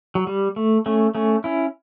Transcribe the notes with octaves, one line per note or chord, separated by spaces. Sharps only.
F#3
G3
A3
A3 C#4
A3 C#4
C#4 E4